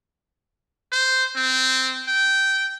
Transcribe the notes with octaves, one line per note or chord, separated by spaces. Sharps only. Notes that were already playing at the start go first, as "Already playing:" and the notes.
C5
C4
G5